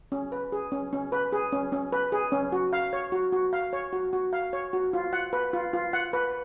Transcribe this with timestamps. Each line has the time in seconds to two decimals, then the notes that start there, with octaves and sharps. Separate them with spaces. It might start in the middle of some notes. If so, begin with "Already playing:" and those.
0.12 C#4
0.32 B4
0.52 G#4
0.72 C#4
0.93 C#4
1.12 B4
1.32 G#4
1.52 C#4
1.72 C#4
1.92 B4
2.12 G#4
2.32 C#4
2.52 F#4
2.73 F5
2.93 C#5
3.12 F#4
3.33 F#4
3.53 F5
3.73 C#5
3.93 F#4
4.13 F#4
4.33 F5
4.53 C#5
4.73 F#4
4.93 F4
5.13 F#5
5.33 B4
5.53 F4
5.73 F4
5.93 F#5
6.13 B4